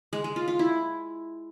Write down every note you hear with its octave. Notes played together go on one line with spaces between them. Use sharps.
G#3
G#3
F4
F4
E4